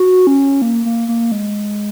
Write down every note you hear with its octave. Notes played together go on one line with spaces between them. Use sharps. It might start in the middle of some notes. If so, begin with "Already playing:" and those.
Already playing: F#4
C#4
A#3
A#3
A#3
G#3